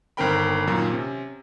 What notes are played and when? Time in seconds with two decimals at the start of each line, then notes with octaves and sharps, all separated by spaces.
0.17 G1 D#3 C4 A#4 G5 B5
0.67 F#2 A#2 D#3
0.90 C3 C#4